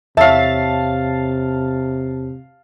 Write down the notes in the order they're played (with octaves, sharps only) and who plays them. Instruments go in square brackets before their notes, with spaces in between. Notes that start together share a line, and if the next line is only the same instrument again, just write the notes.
[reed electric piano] E2 C#5 [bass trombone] C3 [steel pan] E5 [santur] F5 A5